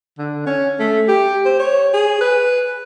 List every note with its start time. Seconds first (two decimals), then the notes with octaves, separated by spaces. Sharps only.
0.18 D3
0.46 C#4
0.79 A3
1.08 G4
1.45 C5
1.59 C#5
1.94 G#4
2.21 B4